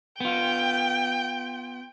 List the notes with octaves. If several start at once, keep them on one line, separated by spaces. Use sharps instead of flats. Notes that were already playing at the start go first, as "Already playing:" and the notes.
B3 F4 G5